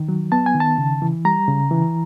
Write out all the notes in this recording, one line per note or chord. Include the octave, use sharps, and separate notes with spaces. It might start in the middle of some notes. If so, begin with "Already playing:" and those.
Already playing: D#3
F#3
B3 A5
G#5
D#3
A5
C#3
E3
G3 A#5
C#3
E3